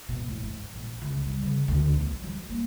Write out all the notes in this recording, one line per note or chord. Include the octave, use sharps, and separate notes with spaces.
B2
A2
G#2
A#1
C#2
G3
C#3
D2
B1
F3
F#3
A#3